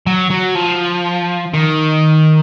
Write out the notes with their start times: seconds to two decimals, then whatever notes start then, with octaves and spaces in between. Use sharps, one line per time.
0.07 F#3
0.30 F#3
0.55 F3
1.54 D#3